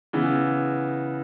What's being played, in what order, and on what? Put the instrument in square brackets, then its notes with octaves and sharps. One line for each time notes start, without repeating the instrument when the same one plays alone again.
[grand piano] C#3 E3 B3